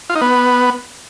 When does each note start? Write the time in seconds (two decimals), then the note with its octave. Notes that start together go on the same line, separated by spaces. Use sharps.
0.10 F4
0.15 D#4
0.21 B3